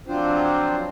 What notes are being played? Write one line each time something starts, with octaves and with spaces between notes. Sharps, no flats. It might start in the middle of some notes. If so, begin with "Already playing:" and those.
F3 F#3 C4 D4 F4 C5